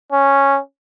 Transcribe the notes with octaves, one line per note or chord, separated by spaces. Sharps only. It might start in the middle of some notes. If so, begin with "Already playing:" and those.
C#4